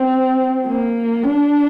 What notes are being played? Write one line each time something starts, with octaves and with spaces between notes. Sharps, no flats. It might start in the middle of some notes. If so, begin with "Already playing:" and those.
Already playing: C4
A#3
D4